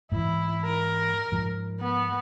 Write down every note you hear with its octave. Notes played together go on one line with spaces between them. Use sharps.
G#2 E3 E4
A#4
G#2 F3
B3